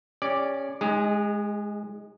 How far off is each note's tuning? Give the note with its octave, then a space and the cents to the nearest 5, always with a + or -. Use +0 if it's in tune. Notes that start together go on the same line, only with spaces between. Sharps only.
C#4 +0 G4 +45 D5 +0
G#3 +10 D#4 +0 G#4 -35